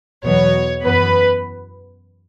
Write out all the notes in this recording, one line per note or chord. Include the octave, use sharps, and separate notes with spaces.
E2 B2 F#3 B3 C#5
F#2 E3 B3 B4